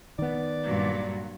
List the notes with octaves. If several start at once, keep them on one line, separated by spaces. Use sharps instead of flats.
D#3 B3 D5
G2 A#2 F#3